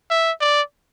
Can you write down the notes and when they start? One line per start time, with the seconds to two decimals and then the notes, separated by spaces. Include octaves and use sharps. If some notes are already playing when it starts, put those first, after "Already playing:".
0.11 E5
0.41 D5